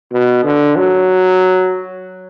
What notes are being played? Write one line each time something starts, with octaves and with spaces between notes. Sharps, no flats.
B2
D3
F#3